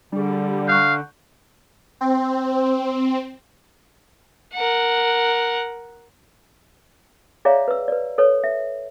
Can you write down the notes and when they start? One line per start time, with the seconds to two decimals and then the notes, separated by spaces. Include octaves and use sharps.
0.12 D3 G3 D4 G#4
0.68 F5 C#6 F#6 G6
2.01 C4
4.54 A#4 F#5
7.45 G#4 C#5 D5 E5 F5 A#5
7.68 B4 E6
7.88 B4 D5
8.18 A4 B4 C#5
8.44 E5